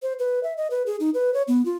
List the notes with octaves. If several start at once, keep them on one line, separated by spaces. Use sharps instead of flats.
C5
B4
E5
D#5
B4
G#4
D#4
B4
C#5
B3
F4